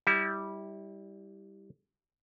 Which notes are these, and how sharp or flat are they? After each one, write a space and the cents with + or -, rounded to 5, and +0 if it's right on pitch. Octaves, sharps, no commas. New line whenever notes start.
G3 +0 E4 -25